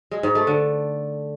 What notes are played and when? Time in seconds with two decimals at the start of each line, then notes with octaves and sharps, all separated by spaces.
0.11 G#3
0.23 G#2
0.35 A3
0.47 D3